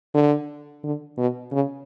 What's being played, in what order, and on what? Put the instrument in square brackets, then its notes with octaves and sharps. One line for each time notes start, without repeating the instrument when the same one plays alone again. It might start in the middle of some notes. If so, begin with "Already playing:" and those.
[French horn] D3
D3
B2
C#3